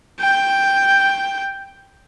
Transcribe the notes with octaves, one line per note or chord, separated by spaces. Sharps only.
G5 G6